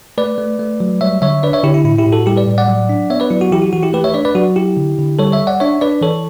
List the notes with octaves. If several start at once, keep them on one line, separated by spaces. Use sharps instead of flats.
A3 B4 D5
A3
A3
F#3
G3 C#5 E5
D3 C#5 E5
D4 B4 D5
C#5 E5
D3 E4 G4
E4
A2 E4
E4 G4
A2
F#4 A4
G3 E4 G4
B4 D5
A2
D5 F#5
F#3
D4
B3 C#5 E5
B4 D5
F#3 E4
F#4
E3 E4 G4
F#4
E3 F#4
E4 G4
A3 G4 B4
C#5 E5
D4 B4 D5
B4 D5
F#3 F#4
E4 G4
D3
D3
G3 A4 C#5
C#5 E5
G3
D5 F#5
D4 C#5 E5
D4 B4 D5
E3 A4 C#5